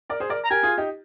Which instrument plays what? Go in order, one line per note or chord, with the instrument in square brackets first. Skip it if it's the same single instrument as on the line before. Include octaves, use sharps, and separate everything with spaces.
[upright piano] A#4 D5
G#4 C5
A#4 D5
[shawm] A#5
[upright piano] G4 A#4 [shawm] G#5
[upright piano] F4 G#4
D#4 G4